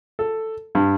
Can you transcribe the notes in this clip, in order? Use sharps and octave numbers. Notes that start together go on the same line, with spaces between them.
A4
G2